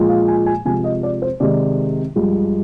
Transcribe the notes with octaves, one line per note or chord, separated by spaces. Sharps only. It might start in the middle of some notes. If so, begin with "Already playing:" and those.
Already playing: A#2 F3 G#3
F5
G#5
G#5
C3 F3 G#3 G#5
D#5
D5
C5
C3 D#3 G#3 D5
G2 F3 G#3